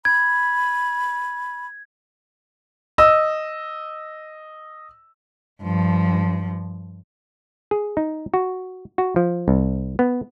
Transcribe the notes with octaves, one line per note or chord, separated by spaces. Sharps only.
B5 G#6
D#5 E6
G2 F3
G#4
D#4
F#4
F#4
F3
C2
B3